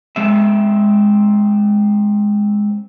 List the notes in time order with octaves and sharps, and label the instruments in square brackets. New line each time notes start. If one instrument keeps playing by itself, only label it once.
[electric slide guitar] G#3 C4 E5